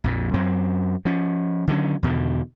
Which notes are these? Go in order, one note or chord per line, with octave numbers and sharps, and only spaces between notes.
A#1 F2 A#2
F#2 F#3 C4
F3 C#4
D3 D#3 F#3 C#4
E2 B2 D3 D#3